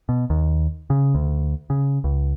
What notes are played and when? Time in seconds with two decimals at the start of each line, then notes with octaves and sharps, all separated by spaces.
0.09 B2
0.30 D#2
0.90 C#3
1.15 D2
1.70 C#3
2.04 C#2